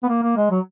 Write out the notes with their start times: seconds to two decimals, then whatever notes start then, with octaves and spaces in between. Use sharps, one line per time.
0.03 B3
0.09 A#3
0.23 A#3
0.37 G#3
0.50 F#3